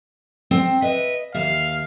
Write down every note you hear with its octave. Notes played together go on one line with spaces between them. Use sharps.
C4
B4 D#5 E5
D#2 E5 F5